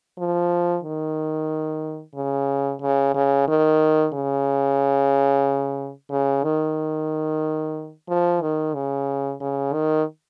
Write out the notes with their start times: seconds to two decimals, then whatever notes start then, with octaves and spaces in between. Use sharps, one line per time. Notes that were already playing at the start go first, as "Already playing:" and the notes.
0.18 F3
0.83 D#3
2.15 C#3
2.82 C#3
3.14 C#3
3.48 D#3
4.13 C#3
6.10 C#3
6.43 D#3
8.08 F3
8.41 D#3
8.74 C#3
9.40 C#3
9.73 D#3